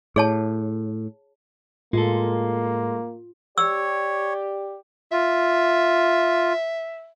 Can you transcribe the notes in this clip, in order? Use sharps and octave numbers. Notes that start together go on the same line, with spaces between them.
A2 G#4 C#5 A5
A2 G#3 A#3 F4 A4
G4 C#5 D5 E6
F4 E5